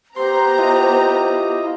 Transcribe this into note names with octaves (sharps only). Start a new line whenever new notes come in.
B3 G4 C5 A#5 C6
E4 F4 D#5